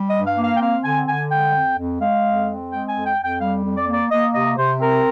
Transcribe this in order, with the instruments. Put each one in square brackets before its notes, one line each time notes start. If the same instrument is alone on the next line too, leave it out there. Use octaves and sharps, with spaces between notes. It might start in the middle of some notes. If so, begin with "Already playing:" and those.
Already playing: [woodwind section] G3
D#5
G2
F5
A#3
F5
G5
C4 F5
D3 G#5
D3 G#5
G#3 G5
F2
F2
G#3 F5
F2
C4
G#3 G5
G#5
F2
G5
F2
G5
G3 F5
F2
D5
A#3
D5
A#3 D#5
C3 D#5
C3 C5
C4 A#4